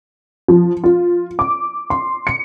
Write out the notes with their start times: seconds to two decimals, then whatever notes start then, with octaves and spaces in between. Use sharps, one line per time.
0.48 F3
0.84 F4
1.39 D6
1.90 C6
2.27 C#7